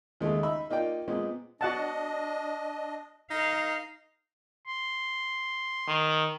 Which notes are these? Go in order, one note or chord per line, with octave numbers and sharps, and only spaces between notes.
D#2 C#3 G#3 A3
D#4 E5 B5
A#3 D#4 F4 D5 G5
A#2 G#3 B3 C4
D4 F#4 D#5 F#5 A5
D#4 A#4 F5
C6
D#3